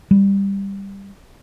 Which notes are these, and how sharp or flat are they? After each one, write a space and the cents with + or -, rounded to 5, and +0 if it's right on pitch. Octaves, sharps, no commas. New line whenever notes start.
G3 +10